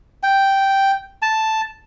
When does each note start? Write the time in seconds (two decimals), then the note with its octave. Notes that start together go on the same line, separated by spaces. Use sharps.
0.23 G5
1.22 A5